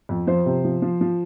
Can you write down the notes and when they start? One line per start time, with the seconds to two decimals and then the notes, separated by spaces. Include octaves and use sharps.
0.09 F2
0.27 F3 C5
0.46 C3
0.64 F3
0.82 F3
1.01 F3